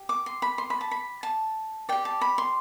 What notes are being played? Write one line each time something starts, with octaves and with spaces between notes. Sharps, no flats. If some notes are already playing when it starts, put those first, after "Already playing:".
Already playing: G4
D6
C6
B5
C6
B5
A5
B5
A5
G4 D5 G5
A5
B5
C6